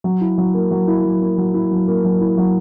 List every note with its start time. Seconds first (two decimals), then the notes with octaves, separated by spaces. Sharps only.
0.04 F#3
0.21 E4
0.38 F#3
0.54 A#3
0.71 F#3
0.87 E4
1.04 F#3
1.21 A#3
1.38 F#3
1.54 E4
1.71 F#3
1.88 A#3
2.04 F#3
2.21 E4
2.38 F#3